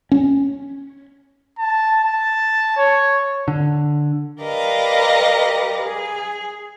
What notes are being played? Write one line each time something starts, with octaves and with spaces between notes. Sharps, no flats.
C#4
A5
A5
C#5
D3
G4 A#4 B4 D5 D#5 F5
G#4